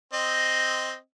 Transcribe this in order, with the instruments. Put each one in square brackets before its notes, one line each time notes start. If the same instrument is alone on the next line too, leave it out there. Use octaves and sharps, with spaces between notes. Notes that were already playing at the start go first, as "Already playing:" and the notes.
[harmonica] C4 D#5